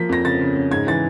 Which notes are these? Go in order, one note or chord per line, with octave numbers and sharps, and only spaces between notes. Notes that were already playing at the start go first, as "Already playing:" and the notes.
Already playing: F3 A#3 B6
F2 A#6
C#3 A6
C#3
C#3
G#2 G#6
E3 A6